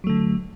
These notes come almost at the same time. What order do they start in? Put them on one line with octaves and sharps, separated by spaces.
F#3 A3 D3